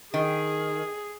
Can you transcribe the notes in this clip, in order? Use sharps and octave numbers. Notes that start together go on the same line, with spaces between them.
D#3 G#4